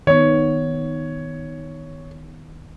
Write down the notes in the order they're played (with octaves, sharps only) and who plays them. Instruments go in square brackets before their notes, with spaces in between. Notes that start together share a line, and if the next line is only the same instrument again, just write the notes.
[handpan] D#3 B3 [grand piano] C#5